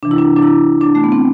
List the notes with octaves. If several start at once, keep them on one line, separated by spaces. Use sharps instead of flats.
C3 E3 D4
E4
D4
D4
E4
D4
A3
B3
C4